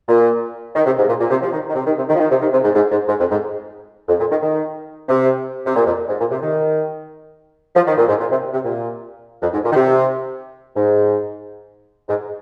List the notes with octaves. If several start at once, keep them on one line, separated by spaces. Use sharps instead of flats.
A#2
D#3
C3
G#2
A#2
A#2
C3
F3
D#3
D#3
C3
D#3
C3
D#3
F3
D#3
C3
D#3
C3
G#2
G#2
G#2
G#2
F2
G#2
F2
A#2
D#3
D#3
C3
C3
A#2
F2
G#2
A#2
C3
D#3
F3
D#3
A#2
G#2
A#2
C3
C3
A#2
F2
G#2
A#2
D#3
C3
G#2
G#2